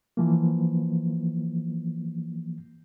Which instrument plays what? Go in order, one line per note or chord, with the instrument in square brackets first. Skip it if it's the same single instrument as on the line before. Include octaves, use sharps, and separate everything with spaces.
[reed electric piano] E3 F3 A#3